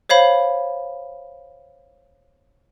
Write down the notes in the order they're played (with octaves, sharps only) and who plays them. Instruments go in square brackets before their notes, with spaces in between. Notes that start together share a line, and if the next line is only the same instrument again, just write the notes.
[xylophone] C5 C#5 F5 B5